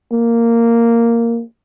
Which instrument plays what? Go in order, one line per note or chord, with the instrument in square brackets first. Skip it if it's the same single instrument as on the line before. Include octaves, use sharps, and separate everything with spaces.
[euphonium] A#3